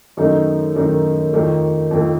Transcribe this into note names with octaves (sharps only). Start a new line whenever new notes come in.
F#2 D#3 A3 D#4
F#2 D#3 A3 D#4
F2 D#3 A3
F2 D#3 A3